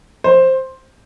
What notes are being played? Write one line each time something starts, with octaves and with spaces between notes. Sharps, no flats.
C5